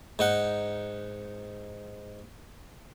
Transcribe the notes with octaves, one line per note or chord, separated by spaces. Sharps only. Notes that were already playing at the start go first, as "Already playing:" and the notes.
G#2 D#4 F#5